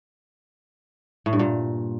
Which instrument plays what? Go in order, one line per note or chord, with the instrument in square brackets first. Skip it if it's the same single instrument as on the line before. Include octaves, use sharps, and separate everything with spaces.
[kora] A2
G2
A#2